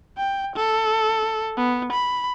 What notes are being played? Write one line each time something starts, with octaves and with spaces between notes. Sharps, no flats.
G5
A4
B3
B5